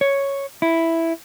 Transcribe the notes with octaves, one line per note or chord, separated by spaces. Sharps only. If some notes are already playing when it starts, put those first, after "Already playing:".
C#5
E4